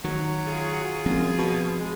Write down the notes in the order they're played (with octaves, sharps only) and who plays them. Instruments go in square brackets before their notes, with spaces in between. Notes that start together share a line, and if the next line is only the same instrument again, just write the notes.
[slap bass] D#3 [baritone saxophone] F#3
[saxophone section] F4 G#4
[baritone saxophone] F#2 [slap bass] F3 C4
[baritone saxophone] B2
G#3